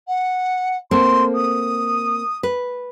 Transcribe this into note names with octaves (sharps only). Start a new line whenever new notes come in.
F#5
A#3 C4 A4 C6
D#6
B4